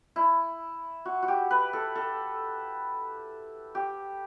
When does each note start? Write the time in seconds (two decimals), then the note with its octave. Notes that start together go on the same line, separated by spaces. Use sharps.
0.16 E4
1.05 F#4
1.22 F#4
1.28 G4
1.51 B4
1.73 A4
1.95 A4
3.75 G4